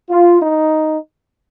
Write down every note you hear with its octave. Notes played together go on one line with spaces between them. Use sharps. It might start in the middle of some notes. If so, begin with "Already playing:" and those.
F4
D#4